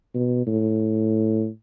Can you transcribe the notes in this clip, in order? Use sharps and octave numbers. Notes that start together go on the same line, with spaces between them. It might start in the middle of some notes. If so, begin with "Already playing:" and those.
B2
A2